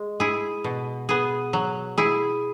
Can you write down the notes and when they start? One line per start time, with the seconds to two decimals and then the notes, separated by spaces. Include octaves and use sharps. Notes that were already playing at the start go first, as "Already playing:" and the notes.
Already playing: G#3
0.20 E4 G#4
0.64 B2
1.09 B3 G#4
1.53 F#3
1.98 E4 G#4